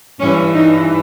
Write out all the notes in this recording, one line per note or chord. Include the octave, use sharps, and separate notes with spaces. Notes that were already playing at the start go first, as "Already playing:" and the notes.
G2 E3 C#4
D#4